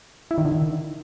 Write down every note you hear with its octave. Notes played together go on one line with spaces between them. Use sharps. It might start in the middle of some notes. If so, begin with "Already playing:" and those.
E4
D#3
D3
D#3